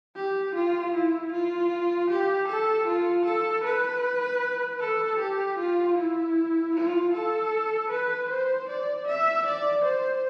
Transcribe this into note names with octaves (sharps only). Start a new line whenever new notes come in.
G4
F4
E4
F4
G4
A4
F4
A4
B4
A4
G4
F4
E4
F4
A4
B4
C5
D5
E5
D5
C5